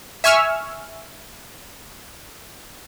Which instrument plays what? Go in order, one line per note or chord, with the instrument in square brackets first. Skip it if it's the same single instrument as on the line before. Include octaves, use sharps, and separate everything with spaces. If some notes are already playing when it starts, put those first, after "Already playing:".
[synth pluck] E5 G#5 C#6 E6 F6